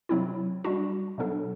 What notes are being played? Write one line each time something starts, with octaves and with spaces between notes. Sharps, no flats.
C3 F#3 C4 E4
G3 D4 F#4
B2 F#3 B3 D4 A4